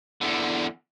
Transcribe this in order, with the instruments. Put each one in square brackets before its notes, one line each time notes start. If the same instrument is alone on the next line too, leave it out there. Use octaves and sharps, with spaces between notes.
[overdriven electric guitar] E2 D3